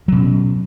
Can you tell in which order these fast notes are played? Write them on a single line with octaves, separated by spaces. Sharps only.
F#3 B2 C#4